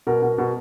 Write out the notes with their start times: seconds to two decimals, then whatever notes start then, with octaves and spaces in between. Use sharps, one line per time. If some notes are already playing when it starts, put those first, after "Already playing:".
0.07 B2 A#4
0.22 B2
0.38 B2